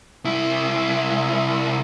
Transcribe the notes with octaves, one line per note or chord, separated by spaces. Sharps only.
C2 E4